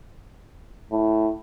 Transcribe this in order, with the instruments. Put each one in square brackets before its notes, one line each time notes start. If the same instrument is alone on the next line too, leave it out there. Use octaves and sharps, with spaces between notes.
[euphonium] A2